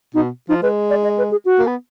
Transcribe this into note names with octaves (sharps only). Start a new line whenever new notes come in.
B2 D#4
F3 D#4
G#3 B4
D5
D#5
B4
G#4
F#4
A#3
B3